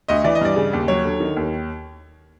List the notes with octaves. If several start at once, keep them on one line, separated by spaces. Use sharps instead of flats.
D2 D#5
E3 D5
D#5
G2 D5
C#3
D#2
F#3 C#5
D3
D#3
D#2